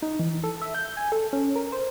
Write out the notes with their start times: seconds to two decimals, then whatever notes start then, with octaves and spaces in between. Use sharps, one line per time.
0.02 D#4
0.19 E3
0.44 A4
0.62 E5
0.75 G6
0.97 G#5
1.12 A4
1.33 C#4
1.56 A#4
1.72 C5